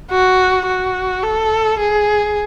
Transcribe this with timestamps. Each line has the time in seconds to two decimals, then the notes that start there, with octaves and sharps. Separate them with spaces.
0.11 F#4
0.67 F#4
1.23 A4
1.79 G#4